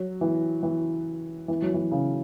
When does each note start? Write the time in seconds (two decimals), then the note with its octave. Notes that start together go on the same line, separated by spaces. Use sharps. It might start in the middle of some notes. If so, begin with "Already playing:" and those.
Already playing: F#3
0.21 E3
0.63 E3
1.48 E3
1.62 F#3
1.74 E3
1.92 C#3